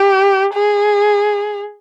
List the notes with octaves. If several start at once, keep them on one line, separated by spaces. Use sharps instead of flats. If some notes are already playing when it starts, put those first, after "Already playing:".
Already playing: G4
G#4